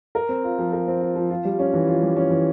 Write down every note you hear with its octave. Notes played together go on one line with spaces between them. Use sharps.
A#4
C4
F4
F3
A#4
C4
F4
F3
F4
G3
C#4
E3
F4
G3
C#4
E3